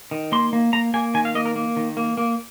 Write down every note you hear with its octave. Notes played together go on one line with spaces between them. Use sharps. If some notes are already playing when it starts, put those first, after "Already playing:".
D#3
A#3 C6
A#3
A#3 A#5
A#3 G#5
D#3 G#5
F5
A#3 D#5
A#4
A#3
D#3
A#3
A#3